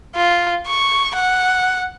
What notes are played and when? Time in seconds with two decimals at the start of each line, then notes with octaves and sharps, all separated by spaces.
0.16 F4
0.67 C#6
1.15 F#5